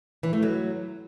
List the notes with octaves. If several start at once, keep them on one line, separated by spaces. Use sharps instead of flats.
E3
A3
F#3